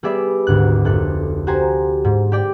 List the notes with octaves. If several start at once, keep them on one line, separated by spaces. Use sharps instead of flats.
G3 B3 G#4 D5 E5 B6
G#1 D2 G#2 F#6
F1 A4 F#6
F#4 G4 C5 G#5 A#5
G#2
G4 D5 G5